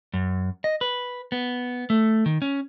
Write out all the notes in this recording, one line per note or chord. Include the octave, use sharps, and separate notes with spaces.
F#2
D#5
B4
B3
A3
D#3
C#4